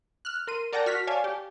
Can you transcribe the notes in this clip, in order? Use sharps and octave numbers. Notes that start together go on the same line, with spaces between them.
F6 F#6
A#4 C6 D#7
A#4 D5 F#5 G5 A5 A#6
F#4 F6 B6
C#5 D5 F5 G#5 A5
G4